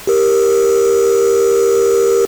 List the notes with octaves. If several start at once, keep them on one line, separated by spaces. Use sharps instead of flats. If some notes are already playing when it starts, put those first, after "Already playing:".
G4 A#4